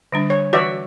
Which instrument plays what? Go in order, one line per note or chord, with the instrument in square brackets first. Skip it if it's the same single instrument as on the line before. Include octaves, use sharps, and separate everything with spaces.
[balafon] D3 G3 D4
[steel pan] C#5
[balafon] E3 B4 [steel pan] F#4 D5 E5